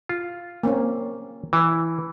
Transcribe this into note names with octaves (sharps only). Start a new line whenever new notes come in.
F4
A#3 C4 C#4
E3